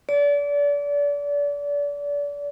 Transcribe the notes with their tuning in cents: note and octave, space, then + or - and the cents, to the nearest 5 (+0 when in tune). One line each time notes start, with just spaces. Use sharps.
D5 -30